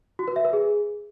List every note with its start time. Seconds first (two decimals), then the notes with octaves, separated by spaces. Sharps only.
0.19 F#4
0.28 B4
0.36 E5
0.45 B4
0.53 G#4